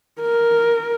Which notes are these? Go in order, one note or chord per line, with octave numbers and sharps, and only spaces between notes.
A#4